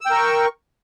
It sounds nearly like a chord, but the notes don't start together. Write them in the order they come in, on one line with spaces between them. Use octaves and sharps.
E6 G5 A#4 C#6